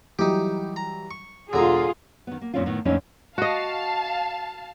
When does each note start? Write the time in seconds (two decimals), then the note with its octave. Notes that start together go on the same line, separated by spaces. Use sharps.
0.19 E3 F#3 G3 D#4 G4
0.76 A#5
1.11 C#6
1.53 E1 D3 F4 G4 G#4 A#5 D#6
2.27 D#3 B3
2.41 A#3
2.54 F#2 A#2 D#3 C4 C#4 F4
2.66 A2 D#3 B3
2.85 F2 A#2 D3 A3 C#4 D#4
3.38 F#4 D#5 F5 A5